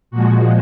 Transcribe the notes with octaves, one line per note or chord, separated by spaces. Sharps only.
A#2 F3 G#3 F#4